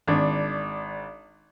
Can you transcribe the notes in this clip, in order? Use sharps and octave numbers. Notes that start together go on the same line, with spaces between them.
G#1 D4